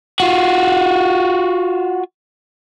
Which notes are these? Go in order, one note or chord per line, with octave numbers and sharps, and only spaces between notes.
F4 F#4